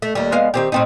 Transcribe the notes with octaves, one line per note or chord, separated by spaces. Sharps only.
A3
D#2 G3
G#3 B3 F5
D#3 C4 G4
A2 C4 D#4